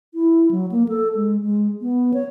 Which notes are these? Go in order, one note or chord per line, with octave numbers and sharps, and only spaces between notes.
E4
F#3
A#3
A4
G#3
G#3
B3
C#5